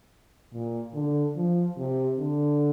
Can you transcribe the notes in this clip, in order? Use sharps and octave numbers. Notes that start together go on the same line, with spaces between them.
A#2
D3
F3
C3
D3